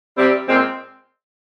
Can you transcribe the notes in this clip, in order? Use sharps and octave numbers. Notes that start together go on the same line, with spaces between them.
C3 G3 C4 E4 G4
A#2 G#3 C4